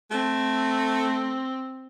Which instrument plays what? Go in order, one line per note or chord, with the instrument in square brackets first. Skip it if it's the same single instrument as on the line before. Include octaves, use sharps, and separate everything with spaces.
[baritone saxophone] A3 [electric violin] C4